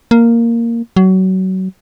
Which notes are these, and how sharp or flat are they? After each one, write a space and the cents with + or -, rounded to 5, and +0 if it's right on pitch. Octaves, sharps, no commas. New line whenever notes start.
A#3 -5
F#3 +25